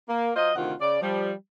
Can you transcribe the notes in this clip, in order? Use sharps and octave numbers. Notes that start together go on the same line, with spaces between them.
A#3
F#3 F4 C5 D#5
D2 C3 D#3 F4 F#5
C#3 D5
F3 G3